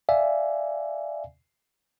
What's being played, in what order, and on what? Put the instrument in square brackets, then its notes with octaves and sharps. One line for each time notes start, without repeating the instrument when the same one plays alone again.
[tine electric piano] D5 E5 F5 G#5